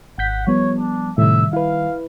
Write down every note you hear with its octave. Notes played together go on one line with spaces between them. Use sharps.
G#1 F#5 G6 B6
F3 G3 B3 C#5
D4
A2 C3 D#3 G3 E5
E4 B4 F5